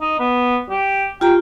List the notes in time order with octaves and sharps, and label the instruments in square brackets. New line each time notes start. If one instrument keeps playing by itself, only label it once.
[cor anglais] D#4
B3
G4
[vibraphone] F4 G4 A#5 [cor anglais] G5